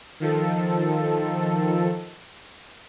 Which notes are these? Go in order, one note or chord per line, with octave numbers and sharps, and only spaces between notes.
D#3 F3 A4